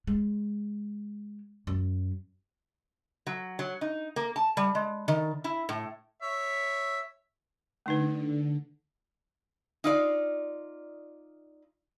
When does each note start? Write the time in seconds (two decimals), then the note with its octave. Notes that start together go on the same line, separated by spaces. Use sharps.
0.07 G#3
1.67 F#2
3.27 F#3
3.59 F#3
3.81 D#4
4.16 A#3
4.36 A5
4.57 G3
4.75 G#3
5.08 D#3
5.44 E4
5.69 A2
6.22 C#5 E5
7.86 D3 A3 D#4 B4
9.84 D#4 F4 D5